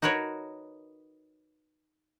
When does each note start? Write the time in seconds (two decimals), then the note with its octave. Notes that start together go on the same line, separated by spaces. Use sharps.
0.02 D#4 F#4 A#4 B4 C#5